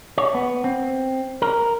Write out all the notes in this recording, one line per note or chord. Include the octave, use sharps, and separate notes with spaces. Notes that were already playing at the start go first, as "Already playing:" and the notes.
C#5
B3
C4
A#4